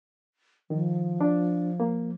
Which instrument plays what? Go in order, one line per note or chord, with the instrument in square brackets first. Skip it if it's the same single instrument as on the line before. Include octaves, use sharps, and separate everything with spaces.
[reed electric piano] D#3 [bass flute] F3
[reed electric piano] D4
A#3